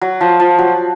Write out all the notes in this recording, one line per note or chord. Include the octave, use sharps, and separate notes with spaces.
F#3
F3
F3
F#3